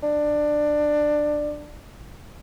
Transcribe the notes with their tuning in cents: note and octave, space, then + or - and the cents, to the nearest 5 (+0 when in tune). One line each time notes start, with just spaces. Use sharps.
D4 +15